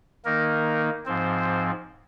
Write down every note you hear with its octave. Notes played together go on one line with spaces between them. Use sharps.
D#3 A#3 D#4 A#4
G#2 F3 C4 C5